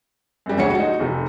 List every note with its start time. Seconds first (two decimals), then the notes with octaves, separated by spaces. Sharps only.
0.46 F#2 G3
0.58 D2 G#2 F#4 C#5 C#7
0.75 D#4 F#4
1.00 F1 C3